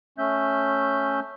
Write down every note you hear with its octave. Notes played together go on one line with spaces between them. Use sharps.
A3 C#4 E5 G6